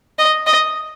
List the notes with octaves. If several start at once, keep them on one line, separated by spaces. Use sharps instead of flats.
D#5
D#5